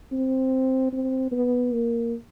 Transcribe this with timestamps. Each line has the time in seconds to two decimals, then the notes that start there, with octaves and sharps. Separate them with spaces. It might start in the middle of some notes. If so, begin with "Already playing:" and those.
0.12 C4
0.93 C4
1.32 B3
1.72 A#3